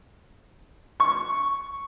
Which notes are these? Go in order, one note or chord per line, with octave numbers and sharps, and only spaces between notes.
C#6